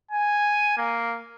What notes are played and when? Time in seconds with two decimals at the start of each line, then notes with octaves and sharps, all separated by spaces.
0.11 G#5
0.77 A#3